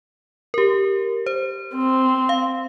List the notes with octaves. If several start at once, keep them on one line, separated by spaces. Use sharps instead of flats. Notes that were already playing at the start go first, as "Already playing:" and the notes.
G4 A#4
C5
C4
F5